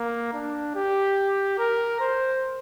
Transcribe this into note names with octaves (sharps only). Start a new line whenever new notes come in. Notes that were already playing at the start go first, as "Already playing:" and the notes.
Already playing: A#3
D4
G4
A#4
C5